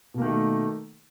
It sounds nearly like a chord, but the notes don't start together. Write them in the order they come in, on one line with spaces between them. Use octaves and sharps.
B2 A#3 D#3 A3